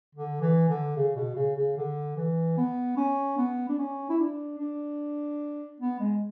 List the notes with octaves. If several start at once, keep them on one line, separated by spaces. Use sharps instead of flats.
D3
E3
D3
C#3
B2
C#3
C#3
D3
E3
B3
C#4
B3
D4
C#4
E4
D4
D4
B3
G#3